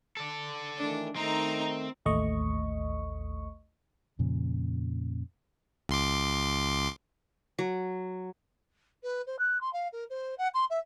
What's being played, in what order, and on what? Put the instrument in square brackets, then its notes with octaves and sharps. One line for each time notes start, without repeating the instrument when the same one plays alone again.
[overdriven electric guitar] A4 D5
[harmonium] D#3 E3 A3 [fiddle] D4
[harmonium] D#3 A3 [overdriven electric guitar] C4 [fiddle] D#4 A#5
[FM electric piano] A1 D#2 A3 D#5 C#6
[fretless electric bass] F2 A#2 C#3 F3
[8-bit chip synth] C#2 C6 D6
[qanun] F#3
[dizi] B4
C5
F#6
C6
F5
A#4
C5
F#5
C6
E5